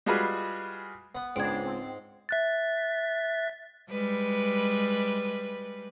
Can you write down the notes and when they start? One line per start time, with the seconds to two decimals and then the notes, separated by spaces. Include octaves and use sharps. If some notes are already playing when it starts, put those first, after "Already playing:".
0.06 G3 G#3 F4 F#4 G#4 B4
1.15 B3
1.36 C#2 G#2 B3 D4 G5 G#6
1.64 C4
2.29 E5 F#6 A6
3.90 G3 G#3 B4